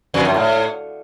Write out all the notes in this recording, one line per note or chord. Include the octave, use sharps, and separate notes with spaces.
F2
F#2
A2